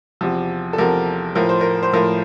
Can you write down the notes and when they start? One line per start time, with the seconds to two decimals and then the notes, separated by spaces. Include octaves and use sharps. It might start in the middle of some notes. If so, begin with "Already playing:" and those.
0.21 E2 C3 F3
0.73 A4
0.78 E2 C3 F3 A#4
1.35 A2 F3 A#4
1.49 C5
1.61 A#4
1.83 C5
1.93 A2 F3 A#4